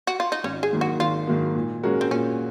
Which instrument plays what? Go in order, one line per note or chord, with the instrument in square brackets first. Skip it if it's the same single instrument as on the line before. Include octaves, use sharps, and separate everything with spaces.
[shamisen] F#4
F4
D#4
[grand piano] G#1 [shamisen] C#4
[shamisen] G#4
[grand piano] G#2 D#3 F#3 A#3
[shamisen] F#4
[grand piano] G#1 [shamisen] F4
[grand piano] G#2 D#3 F#3 A#3
A#2
G#3 C#4 F#4 A#4
[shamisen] C4
[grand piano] A#2 [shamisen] C#4